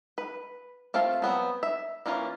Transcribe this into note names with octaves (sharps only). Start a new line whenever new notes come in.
B4
A3 C4 F4 A4 F5
F#3 B3 C4
E5
E3 A#3 C#4 F4